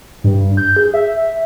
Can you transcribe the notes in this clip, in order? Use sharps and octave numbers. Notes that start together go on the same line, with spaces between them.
G2
G6
G#4
E5